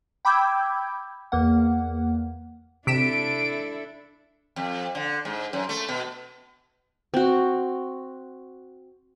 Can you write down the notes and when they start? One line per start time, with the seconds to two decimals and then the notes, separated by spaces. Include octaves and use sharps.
0.25 G5 B5 D6 E6 G6 G#6
1.32 E2 A#3 F#5
2.87 C3 D4 E4 A4 B6 D7 E7
4.56 F2
4.95 D3
5.25 G#2
5.53 F#2
5.69 A3
5.88 B2
7.14 C4 F#4